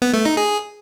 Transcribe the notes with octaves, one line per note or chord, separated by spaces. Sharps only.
B3
A3
D#4
G#4